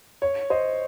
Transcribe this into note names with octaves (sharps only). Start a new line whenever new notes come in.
C#5
C5 D#5